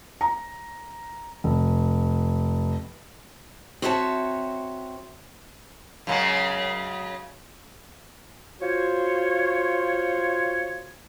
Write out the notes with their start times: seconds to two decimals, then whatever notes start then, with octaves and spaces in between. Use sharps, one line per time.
0.21 A#5
1.44 F1
3.82 C4 F#4 C#5 E5 F5 A5
6.07 F#2 C#3 G#3
8.61 F4 F#4 C5 C#5